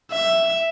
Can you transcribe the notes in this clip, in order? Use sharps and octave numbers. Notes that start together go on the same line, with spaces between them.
E5